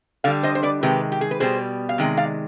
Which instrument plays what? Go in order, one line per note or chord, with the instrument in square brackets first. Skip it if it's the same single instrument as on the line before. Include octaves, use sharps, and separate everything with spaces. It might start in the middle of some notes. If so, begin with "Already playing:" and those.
[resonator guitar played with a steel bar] D3 G3 D5 F5
C5 D#5
C5
B4 D5
C3 D#3 G#3 G4 B4
G4
G#4
B4
B2 G3 G#4 C5
F5
C3 D#3 G#3
D5 F5